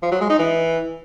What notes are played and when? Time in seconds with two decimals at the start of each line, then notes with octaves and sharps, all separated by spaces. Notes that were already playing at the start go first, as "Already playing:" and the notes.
0.03 F3
0.12 F#3
0.21 G#3
0.30 D#4
0.39 E3